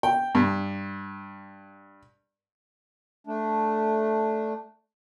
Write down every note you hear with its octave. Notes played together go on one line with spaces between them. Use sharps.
G5
G2
A3 D4